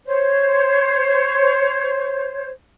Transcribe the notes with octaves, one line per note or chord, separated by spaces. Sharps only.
C5 C#5